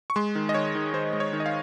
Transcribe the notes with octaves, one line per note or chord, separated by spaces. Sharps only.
C#6
G#3 C6
D#3
D#5
D#3 C#5
D#3
D#3 C5
G#3
C#5
D#3
D#5
F5